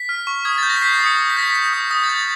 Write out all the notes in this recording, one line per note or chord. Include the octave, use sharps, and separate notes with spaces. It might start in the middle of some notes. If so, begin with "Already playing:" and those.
Already playing: B6
F6
C#6
D#6 G#6
G6 A6
A#6
B6
G6 C7
C7
D#6
C#7
D#6
B6
G6 A#6
B6
G6
D#6
D#6 A#6
A6
G6
A6